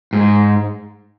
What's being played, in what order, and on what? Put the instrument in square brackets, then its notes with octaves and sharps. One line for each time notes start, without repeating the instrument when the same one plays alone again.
[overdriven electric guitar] G#2